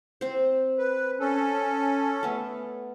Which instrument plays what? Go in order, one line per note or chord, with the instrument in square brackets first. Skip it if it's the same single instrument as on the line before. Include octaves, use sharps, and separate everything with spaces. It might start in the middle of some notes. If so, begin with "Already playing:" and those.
[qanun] C4 C5
[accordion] B4
C#4 A4
[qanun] A3 B3